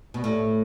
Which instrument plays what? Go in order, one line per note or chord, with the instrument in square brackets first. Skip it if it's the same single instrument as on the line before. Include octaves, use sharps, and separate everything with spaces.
[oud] B2
[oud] A2 [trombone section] A3